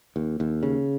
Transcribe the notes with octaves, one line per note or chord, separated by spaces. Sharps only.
D#2
D#2
C#3